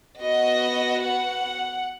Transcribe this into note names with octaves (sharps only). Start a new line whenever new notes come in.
B3 F#4 D#5
F#5